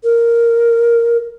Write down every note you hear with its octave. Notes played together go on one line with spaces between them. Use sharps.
A#4